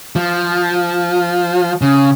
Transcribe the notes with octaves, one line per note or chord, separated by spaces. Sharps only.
F3
C#3